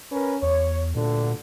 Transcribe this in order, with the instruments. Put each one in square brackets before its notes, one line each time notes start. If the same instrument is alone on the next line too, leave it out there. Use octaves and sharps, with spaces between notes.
[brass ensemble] C#4 A#4 B4
[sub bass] E2 [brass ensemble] C#5
[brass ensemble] D2 G2 D3 [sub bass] A#2